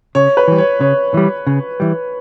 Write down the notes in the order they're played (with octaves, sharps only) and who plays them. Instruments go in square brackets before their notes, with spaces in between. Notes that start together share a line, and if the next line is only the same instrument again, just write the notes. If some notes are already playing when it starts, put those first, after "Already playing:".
[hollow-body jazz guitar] C#3 [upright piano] C#5
[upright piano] B4
[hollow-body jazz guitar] E3 G3
[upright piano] C#5
[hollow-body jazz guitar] C#3 [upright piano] C#5
[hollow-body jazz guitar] E3 G3
C#3
E3 G3